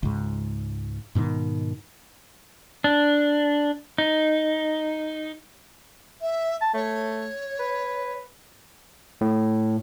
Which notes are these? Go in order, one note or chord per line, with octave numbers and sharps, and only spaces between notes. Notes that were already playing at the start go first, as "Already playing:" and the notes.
C#2 G#2
G#2 B2 D3 D#3
D4
D#4
E5
A5
A3 C#5
B4
A2